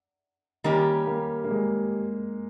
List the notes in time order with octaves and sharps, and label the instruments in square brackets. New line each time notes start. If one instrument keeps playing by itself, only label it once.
[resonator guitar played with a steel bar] D#3 G3 C#4 G4 A#4 [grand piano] A#3
[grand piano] A#3
A#3
G#3